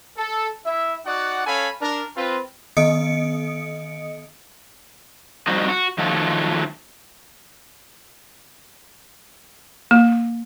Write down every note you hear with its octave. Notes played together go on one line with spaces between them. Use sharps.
A4
E4 E5
D#4 F#4 D5 F#5
C#4 A4 C#5 F5 G#5 B5
D4 A#4
C4 F4 B4
D#3 B3 D#5 D#6 C#7 D7
F2 G3 D#4 F#4 C5 D#5
F#4
D#3 F3 F#3 A3 D#4 F4
A#3